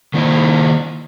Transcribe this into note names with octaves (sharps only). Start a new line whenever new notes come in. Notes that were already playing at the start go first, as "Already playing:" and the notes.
D#3 A#3 E4 C5